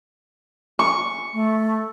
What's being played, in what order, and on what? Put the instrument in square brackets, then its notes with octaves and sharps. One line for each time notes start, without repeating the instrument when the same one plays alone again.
[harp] C#6
[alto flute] A3